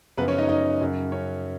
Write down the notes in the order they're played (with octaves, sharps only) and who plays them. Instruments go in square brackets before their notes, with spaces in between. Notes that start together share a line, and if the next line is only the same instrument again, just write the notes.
[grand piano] F#2 C#3 F3 B3 B4
C#4 C#5
D#4 D#5
D#4 D#5
F#2 C#3 F#3
C#4 C#5